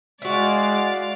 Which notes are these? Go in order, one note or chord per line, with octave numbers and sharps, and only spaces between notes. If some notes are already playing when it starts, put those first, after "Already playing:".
G#3 E4 F#4 D5 F5